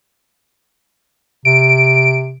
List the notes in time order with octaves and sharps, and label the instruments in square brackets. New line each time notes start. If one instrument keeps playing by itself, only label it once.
[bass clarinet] C3 [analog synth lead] D7